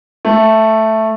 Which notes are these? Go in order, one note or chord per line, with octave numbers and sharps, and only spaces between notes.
A3